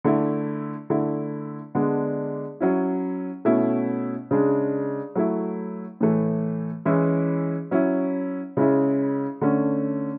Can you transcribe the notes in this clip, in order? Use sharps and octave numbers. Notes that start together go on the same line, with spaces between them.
D3 A3 E4
D3 A3 E4
D3 G#3 B3 D4
F#3 C#4 E4
B2 A3 C#4 E4
C#3 G#3 D4
F#3 A3 E4
A2 E3 A3
E3 G#3 C#4 E4
F#3 C#4 E4
C#3 G#3 C#4 E4
D3 A3 C#4